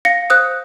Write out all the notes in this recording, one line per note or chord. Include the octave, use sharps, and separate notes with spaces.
F5 A#6 C#7
C5 D#6 F#6